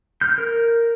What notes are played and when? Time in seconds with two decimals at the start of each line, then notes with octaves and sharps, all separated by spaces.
0.21 F6 G6
0.38 A#4